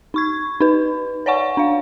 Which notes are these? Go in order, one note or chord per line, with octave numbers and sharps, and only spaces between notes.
D#4 C#6 G#6
D#4 B4
C#5 D5 F#5 G#5 C#6
D4 F5